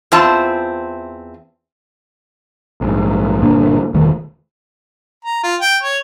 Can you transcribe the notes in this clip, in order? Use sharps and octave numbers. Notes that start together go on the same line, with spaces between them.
E2 C4 F4 E5 A5
A#1 G#2
G1 A#2 A#3 D4
E1 D2 D#3 A3
A#5
F4
G5
C#5